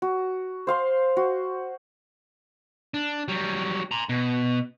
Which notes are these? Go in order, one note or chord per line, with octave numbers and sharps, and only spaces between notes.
F#4
C5 F5 C6
F#4
D4
F#3 G3
A#5 C6
B2